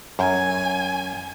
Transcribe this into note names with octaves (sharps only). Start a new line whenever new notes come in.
F#2 G#5